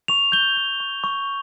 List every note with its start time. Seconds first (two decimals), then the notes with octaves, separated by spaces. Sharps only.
0.08 C#6 F7
0.32 G6 G7
0.57 G6
0.80 C#6
1.04 C#6